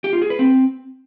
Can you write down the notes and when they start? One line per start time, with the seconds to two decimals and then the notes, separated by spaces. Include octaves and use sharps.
0.04 G4
0.13 F4
0.22 G#4
0.30 B4
0.39 C4